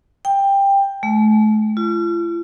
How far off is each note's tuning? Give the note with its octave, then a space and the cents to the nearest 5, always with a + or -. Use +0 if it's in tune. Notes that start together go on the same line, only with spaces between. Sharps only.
G5 +15
A3 -40
F4 -40